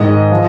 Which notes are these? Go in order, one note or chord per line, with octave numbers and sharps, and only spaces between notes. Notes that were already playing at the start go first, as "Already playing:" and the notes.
Already playing: G#2 D#3 D#5
F3